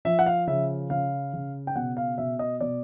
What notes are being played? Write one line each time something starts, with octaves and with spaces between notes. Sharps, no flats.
F3 E5
F#5
F5
C#3 E5
C#3 F5
C#3
G5
B2 F#5
F5
B2 E5
D#5
B2 D5